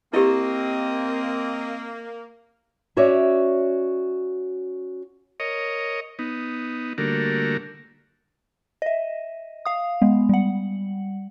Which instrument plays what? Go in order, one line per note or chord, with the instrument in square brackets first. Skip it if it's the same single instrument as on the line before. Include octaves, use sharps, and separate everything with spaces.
[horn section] A#3 [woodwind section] C4 [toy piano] E4 G4 [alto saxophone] D#5
[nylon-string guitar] C#4 F#4 C#5 D5 E5
[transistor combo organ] A#4 C#5 D#5
B3 D#4
D3 G3 A3 A#3 F#4 A#4
[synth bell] D#5 E5
F5 D#6
G#3 B3
G3 F#5